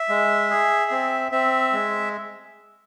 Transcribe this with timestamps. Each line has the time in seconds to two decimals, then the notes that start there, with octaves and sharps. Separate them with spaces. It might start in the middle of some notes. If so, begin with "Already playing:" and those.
Already playing: E5
0.09 G#3
0.50 G#4
0.91 C4
1.32 C4 E5
1.73 G#3